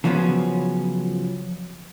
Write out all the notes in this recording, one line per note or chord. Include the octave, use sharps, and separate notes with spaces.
C#3 F3 F#3 B3 C#4